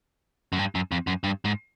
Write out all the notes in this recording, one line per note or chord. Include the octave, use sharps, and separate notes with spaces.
F#2
G2
F#2
F2
F#2
G2
G#2